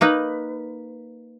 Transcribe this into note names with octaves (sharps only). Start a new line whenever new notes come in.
A#3 D#4 B4